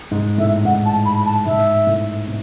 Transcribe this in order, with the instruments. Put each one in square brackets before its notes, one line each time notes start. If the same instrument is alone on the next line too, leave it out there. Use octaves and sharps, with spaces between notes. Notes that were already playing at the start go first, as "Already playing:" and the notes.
[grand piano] G#2
[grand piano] A2 [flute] E5
[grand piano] G#2 [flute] F#5
[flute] A5
B5
A5
[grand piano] G#2 [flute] E5
[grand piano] A2
B2